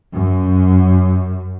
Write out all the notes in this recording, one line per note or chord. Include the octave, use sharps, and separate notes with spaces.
F#2